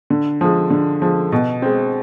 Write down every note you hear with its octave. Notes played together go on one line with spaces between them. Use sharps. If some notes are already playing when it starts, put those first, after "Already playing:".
D3
F3 G#3
D3
F3 G#3
B2
G#3 C4